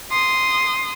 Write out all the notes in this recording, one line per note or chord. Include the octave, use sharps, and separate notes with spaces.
C6 D#6